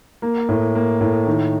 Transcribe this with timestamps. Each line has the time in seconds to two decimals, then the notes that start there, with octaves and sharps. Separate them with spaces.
0.22 A#3
0.49 A2
0.75 A#3
1.01 A2
1.27 D#3